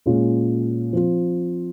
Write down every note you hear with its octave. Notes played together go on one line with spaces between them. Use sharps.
A#2 G#3 C#4 F4
F3 C4 F4 C5